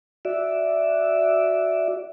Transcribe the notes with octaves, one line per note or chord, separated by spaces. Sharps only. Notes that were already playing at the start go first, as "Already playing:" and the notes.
F#4 D5 E5